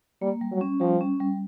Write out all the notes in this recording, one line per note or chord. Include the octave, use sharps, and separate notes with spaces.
G3 A#3
G3
F#3
C#4
F3 G3
C#4
G3